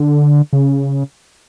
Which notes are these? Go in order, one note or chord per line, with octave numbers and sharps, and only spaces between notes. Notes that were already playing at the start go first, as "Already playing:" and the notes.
Already playing: D3
C#3